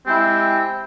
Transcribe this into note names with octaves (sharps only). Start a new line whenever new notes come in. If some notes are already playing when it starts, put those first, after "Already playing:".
G#3 C4 E4 G4